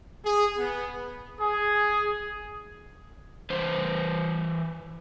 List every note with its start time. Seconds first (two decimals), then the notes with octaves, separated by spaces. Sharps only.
0.25 G#4
0.57 B3
1.38 G#4
3.50 E3 B4 C5